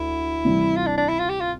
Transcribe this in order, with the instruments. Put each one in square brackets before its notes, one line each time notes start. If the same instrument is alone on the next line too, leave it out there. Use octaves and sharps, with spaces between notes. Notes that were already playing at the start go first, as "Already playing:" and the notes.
Already playing: [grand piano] D2 [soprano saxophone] E4
[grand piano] C3 E3 G3
[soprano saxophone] F4
D4
D4
E4
F4
G4
F4